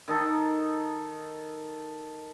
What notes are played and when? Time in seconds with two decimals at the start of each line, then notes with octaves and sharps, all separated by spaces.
0.08 D#3 D#4 A4